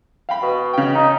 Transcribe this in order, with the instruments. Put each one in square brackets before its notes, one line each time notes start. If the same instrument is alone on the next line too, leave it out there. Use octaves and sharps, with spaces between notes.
[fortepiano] F5 G5 B5
[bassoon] B2
[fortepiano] C#3 G5
[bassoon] D#4